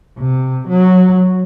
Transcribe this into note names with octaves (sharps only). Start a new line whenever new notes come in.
C3
F#3